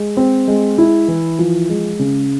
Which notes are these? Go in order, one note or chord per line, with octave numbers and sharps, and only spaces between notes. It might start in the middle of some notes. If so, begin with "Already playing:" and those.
Already playing: G#3
C4
G#3
E4
E3
F3
G#3
C#3